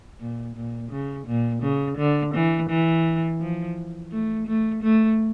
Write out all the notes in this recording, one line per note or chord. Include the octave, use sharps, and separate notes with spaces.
A#2
A#2
C#3
A#2
C#3
D3
E3
E3
F3
A3
A3
A3